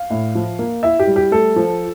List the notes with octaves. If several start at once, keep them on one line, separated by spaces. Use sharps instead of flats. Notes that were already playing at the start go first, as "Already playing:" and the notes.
Already playing: F5
A2
F3
A#3
E4 E5
G4
G3
G4
A3 A4
F3